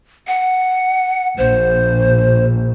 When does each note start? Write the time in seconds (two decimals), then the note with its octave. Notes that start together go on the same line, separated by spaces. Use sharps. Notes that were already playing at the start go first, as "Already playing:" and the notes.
0.27 F#5
1.38 A#1 C5